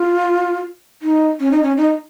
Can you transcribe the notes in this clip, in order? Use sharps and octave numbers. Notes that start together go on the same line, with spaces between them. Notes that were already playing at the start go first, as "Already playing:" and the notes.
Already playing: F4
D#4
C#4
D#4
C#4
D#4